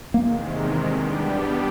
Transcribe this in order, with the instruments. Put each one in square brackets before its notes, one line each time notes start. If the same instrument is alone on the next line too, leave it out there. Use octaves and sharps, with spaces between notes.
[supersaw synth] E2 C3 D#3 G#3 [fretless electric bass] A#3
[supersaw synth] G3 B3 D4 G4